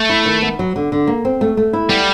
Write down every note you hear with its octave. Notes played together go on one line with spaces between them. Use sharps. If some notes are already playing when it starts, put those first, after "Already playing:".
Already playing: A3
E4
D#3
B3
F#3
D3
D3
A#3
C4
A3
A3
E4
G3 B3